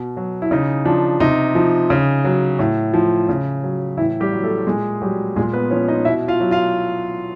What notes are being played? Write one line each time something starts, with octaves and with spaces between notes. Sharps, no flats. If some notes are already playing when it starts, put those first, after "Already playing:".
Already playing: B2
F#3
E4
C#3 D#4
F3 D4
C3 D#4
F3
C#3
F#3
A2
F3
C#3
F#3
A2 E3 E4
G3 G4
F#3
A3 A4
A#2 G#3 G#4
F#3 G3 G4
A#2 G#3 G#4
B3 B4
F3 C#4 C#5
D#4 D#5
B2 E4 E5
F4 F5
F#3
F4 F5